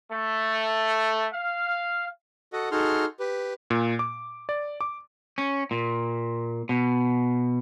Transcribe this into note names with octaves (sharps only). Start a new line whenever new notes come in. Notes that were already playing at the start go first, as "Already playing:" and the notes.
A3
F5
F#4 A4 D#5 F#5
D#4 F#4 G#4 A4 C6 F6
G4 B4
A#2
D6
D5
D6
C#4
A#2
B2